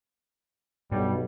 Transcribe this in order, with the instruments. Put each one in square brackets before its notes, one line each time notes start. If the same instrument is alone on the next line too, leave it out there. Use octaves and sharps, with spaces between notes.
[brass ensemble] B1 [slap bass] G2 [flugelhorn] G3